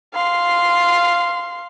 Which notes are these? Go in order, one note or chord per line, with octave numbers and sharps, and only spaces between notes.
F5 C6